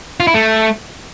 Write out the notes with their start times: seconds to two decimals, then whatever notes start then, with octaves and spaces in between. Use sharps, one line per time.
0.20 F4
0.27 E4
0.34 A3